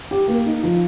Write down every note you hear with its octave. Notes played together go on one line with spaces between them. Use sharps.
G4
A#3
D#4
F3